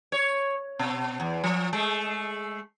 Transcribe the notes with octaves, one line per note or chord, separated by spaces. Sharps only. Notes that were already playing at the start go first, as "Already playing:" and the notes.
C#5
B2
E2
F3
G#3 A3